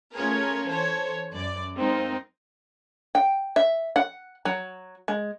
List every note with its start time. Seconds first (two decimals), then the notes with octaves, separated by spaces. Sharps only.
0.14 A3 C#4 F4 G#4 A#4 C#5
0.66 E3 A4 C5 C#5
1.33 F#2 D5
1.77 G#3 C4 D#4 F4 A#4
3.15 G5
3.56 E5
3.96 F#5
4.45 F#3
5.08 G#3